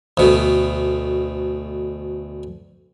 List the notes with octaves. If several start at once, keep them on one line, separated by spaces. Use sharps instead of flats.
D2 B2